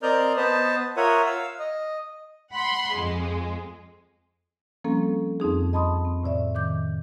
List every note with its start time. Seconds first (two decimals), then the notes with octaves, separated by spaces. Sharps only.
0.03 C4 A#4 D5 D#5 F6 G6
0.37 B3 B4 C5 D#5 A5
0.97 F4 A#4 C#5 E5 F#5 D#6
1.26 F5 E6
1.59 D#5
2.54 F#5 B5 C6
2.92 F2 G#3
4.84 F3 G3 A#3 C4 C#4 A4
5.40 F2 C4 D#4 G#4
5.73 D#5 A5 B5 C6 D#6
6.05 C4
6.23 A2 C3 D5 E5
6.55 D#3 D6 G6